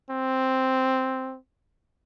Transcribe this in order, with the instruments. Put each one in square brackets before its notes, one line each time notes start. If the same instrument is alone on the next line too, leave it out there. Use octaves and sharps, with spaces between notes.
[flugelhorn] C4